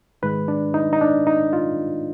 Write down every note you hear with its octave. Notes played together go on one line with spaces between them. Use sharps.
G#2 D#3 G#3 B4
D4
D#4
D#4
D4
D#4
F4